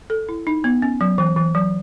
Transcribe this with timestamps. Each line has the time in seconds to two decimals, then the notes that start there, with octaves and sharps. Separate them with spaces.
0.10 A4
0.29 E4
0.47 D#4
0.64 B3
0.82 C#4
1.01 F#3
1.18 E3
1.36 E3
1.55 F#3